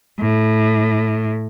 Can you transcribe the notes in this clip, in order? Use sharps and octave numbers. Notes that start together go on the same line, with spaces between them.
A2